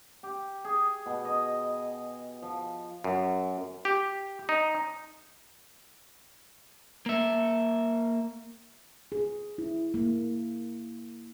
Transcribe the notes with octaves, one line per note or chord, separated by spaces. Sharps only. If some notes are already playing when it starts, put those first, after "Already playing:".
G4
G#4
B2
D#5
F3
F#2
G4
D#4
A#3 E5
G#4
E4
A#3